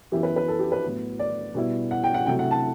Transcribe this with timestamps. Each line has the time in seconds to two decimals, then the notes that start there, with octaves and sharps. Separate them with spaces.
0.12 F#2 E3 B3 E4 G4
0.23 B4
0.36 B4
0.48 A4
0.59 G4
0.72 B4
0.84 A2 F#3 B3
1.19 D5
1.55 B2 G3 B3 E4
1.91 F#5
2.04 G5
2.14 F#5
2.26 C3 F#3 A3 E4 G5
2.39 F#5
2.51 A5